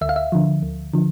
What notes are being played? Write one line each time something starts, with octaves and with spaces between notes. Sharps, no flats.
D2 E5
F5
E5
D3 F3
D2
D3 F3